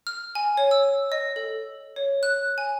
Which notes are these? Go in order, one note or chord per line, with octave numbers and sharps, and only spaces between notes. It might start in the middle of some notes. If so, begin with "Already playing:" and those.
F6
G#5
C#5
E6
D#5
A4
C#5
F#6
G#5